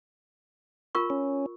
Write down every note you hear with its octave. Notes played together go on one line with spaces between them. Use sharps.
F4 A#4 C#6
C#4